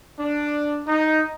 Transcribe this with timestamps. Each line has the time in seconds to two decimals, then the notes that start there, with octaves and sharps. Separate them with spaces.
0.18 D4
0.87 D#4